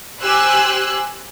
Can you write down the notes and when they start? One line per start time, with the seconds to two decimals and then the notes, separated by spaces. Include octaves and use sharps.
0.22 G4 C5 G#5 E6 F#6